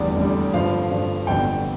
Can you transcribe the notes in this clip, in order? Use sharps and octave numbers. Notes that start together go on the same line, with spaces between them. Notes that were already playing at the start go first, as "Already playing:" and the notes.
Already playing: F1 E2 D3 G3 D5
F1 E2 D3 G3
G2 D3 F3 F5
G2 D3 F3
G1 F2 D3 G3 G5